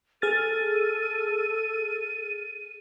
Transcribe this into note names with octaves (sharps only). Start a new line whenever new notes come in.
G#4 A4 F6 A6 D#7